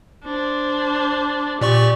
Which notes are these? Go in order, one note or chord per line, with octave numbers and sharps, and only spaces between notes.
D4 C5
A#2 G4 D5 C#6